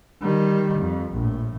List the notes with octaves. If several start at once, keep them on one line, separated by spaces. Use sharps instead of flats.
D#3 G3
F2
A#1 A2